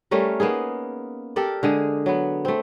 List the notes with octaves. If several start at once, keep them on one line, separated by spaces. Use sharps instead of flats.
G3 A3 C#4 A#4
A#3 B3 D#4 G#4
G4 A4 A#4 D5
D3 G#3 G#4
F#3 B3
A3 C4